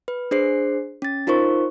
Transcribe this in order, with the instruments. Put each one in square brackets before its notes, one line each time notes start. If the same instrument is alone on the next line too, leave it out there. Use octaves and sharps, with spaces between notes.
[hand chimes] B4
D4 G#4 C5 C7
C#4 A6
D#4 F4 A#4 C5 C#6